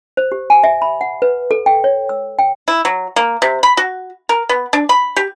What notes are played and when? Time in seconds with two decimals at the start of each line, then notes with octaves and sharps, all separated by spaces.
0.17 C5
0.32 G4
0.50 G#5
0.64 E5
0.82 B5
1.01 F#5
1.22 B4
1.51 A4
1.66 G5
1.84 C#5
2.09 E6
2.39 G5
2.68 E4
2.85 F#3
3.16 A#3
3.42 C3
3.63 B5
3.77 F#4
4.29 A#4
4.49 B3
4.73 D4
4.89 B5
5.16 G4